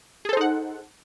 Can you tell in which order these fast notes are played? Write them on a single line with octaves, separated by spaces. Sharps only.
G#4 A4 C5 D#4 F#5